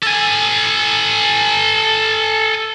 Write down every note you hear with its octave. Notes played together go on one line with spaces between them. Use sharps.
A4 G#5